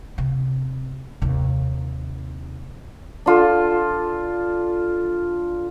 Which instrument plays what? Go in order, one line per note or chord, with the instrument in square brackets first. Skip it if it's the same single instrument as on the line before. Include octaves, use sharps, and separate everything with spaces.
[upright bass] C3
D#2 C3
[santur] D4 F4 A4